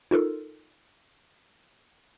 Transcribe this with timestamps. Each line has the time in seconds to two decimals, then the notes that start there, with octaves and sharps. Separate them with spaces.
0.11 D#4 F4 A4 A#4